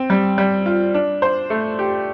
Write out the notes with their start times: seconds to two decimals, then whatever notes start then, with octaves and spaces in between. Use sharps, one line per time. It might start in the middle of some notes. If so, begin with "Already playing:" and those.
Already playing: C4
0.10 G3
0.38 G3
0.66 F4
0.94 D4
1.22 C5
1.50 A3
1.79 G4